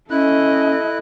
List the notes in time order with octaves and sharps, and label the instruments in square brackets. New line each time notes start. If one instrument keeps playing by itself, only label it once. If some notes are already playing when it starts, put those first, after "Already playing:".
[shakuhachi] C#4 [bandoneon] E4 F#6 [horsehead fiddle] A4 D#5